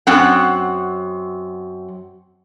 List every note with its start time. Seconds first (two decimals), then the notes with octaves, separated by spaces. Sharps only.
0.07 F#2 C4 F#5